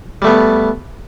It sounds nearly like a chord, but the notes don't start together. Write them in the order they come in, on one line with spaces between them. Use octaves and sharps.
G3 A3 B3